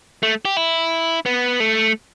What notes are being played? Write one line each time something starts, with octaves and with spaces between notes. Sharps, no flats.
A3
G4
E4
B3
A3